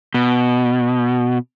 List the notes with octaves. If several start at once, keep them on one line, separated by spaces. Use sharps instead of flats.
B2